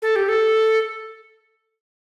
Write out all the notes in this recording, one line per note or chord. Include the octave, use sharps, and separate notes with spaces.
A4
G4
A4